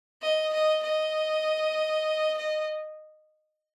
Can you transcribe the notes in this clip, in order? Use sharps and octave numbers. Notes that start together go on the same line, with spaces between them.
D#5
D#5
D#5
D#5